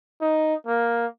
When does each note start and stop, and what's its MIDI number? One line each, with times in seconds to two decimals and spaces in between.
0.21 0.55 63
0.67 1.06 58